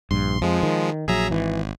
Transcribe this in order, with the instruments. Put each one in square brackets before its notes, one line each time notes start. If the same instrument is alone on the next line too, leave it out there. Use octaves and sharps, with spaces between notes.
[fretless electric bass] A#1 G2 [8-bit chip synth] C6
[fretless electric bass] F2 [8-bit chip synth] F3 G#3
[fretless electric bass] D#3
[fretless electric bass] A#1 F#3 [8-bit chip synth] G#4 E5 A#5
[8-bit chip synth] G#1 [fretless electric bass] E3